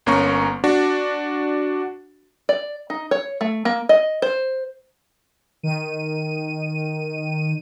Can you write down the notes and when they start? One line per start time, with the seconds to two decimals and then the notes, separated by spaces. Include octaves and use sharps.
0.06 G1 A#3 C#4 A#5 C#6
0.64 D4 F#4
2.49 D5
2.90 D#4
3.11 C#5
3.41 A3
3.65 A#3
3.89 D#5
4.22 C5
5.63 D#3 D#7